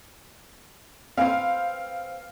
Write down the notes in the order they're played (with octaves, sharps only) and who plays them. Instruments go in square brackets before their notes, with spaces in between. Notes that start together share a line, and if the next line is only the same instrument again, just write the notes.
[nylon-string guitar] C4 B4 C5 [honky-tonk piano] F5